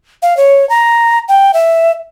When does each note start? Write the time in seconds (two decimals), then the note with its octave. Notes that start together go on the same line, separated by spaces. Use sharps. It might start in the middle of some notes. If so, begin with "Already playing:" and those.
0.22 F5
0.37 C#5
0.69 A#5
1.28 G5
1.54 E5